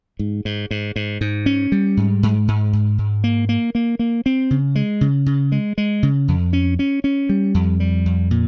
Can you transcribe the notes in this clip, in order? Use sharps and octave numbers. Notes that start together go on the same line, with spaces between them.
G#2
G#2
G#2
G#2
G#2
C#4
G3
G#2
G#2
G#2
G#2
G#2
A#3
A#3
A#3
A#3
C4
C#3
G#3
C#3
C#3
G#3
G#3
C#3
F2
C#4
C#4
C#4
G3
F2
G3
F2
A#2